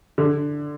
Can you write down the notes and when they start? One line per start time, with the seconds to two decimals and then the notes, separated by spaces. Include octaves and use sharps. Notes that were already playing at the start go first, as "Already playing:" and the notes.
0.18 D3